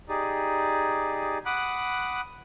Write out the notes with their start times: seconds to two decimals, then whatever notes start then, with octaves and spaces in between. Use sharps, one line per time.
0.09 D#4 G4 G#4 D5
1.46 F#5 B5 D6 D#6 F#6